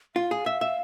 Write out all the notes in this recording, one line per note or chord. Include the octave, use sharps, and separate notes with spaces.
F4 F5
G#4
E5
E5